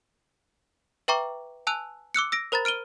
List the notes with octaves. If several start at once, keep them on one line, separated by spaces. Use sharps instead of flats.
B4 E5 G5 A#5 C#6 D6
G#5 A5 E6 F#6 F7
D6 E6 F#6 C#7
E6 A#6 D7
A#4 C5 A#5 B5 A6
F6 D7 D#7 G7